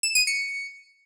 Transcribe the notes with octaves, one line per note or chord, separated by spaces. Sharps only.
E7
D#7
C#7